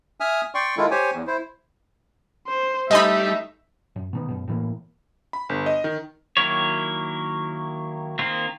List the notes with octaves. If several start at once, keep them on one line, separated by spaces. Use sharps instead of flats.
E5 G#5 D#6 F6
D5 G5 C6 C#6
D#3 G#3 E4 F4 A4
G4 C5 C#5 G#5
E2
E4 C5
C5
G3 A3 D#4 D#5 E5 G#5 B5
F#2
B2 D#3 B3
F#2 B2
A2 E3 A#3
B5
G1
D#5
D#3
D#3 F#3 A#3 E4 C#5
D#3 A#3 C4 F4